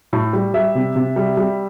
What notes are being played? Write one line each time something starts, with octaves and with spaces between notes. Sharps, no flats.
A2
G3
G3 E5
C3
C3
G3
G3